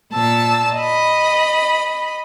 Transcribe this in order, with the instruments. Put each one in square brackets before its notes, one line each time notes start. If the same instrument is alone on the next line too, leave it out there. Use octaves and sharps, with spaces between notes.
[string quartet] A#2 A5 E6
D#5 B5